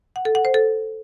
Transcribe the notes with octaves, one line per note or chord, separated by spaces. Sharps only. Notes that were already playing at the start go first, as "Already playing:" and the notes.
F#5
A4
F#5
C5
A4